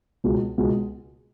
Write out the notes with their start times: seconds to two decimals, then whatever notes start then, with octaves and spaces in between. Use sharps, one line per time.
0.24 C#2 B2 G#3
0.58 C#2 B2 G#3